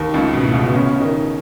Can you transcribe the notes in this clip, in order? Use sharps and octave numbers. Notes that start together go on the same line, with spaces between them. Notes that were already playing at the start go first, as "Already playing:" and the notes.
Already playing: D#2 D#3
C#2 C#3
B2
A2
C#2 C#3
B2 B3
C#3 C#4
C#3 C#4
D#3 D#4